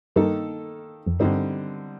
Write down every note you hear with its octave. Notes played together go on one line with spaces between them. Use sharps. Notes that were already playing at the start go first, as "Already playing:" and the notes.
G2 D#3 A#3 D#4 A4
F2
G2 D3 G3 C4 D#4